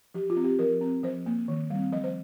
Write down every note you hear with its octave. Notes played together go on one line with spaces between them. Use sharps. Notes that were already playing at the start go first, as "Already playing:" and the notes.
F3 G4
F4
C4
G4
F3 A#4
C4
F3 C5
A#3
D#3
G3 C4
F3 D#5
C5